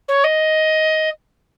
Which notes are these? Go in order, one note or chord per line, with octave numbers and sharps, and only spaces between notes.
C#5
D#5